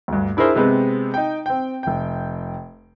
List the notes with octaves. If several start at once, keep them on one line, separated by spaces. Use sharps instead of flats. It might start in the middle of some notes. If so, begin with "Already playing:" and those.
D2 G2
D4 E4 G#4 A#4 C5
C3 G#3 B3 C4
D#4 G5
C4 G5
F1 G5